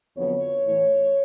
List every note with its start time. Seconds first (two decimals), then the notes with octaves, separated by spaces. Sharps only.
0.17 F2 D3 F#3 B3 C#5
0.65 A2 E3 A3